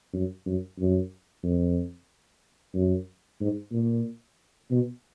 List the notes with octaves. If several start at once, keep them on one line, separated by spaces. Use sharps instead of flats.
F#2
F#2
F#2
F2
F#2
G#2
A#2
B2